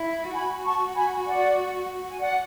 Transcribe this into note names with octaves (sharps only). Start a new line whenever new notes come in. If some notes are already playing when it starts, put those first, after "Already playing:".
Already playing: E4
F#4 G#5 B5
A5 C#6
G#5 B5
D5 F#5
G#5
D5 F#5